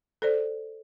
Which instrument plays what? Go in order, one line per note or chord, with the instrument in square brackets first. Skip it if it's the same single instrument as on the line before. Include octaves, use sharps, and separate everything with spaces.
[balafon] A4 C5 D5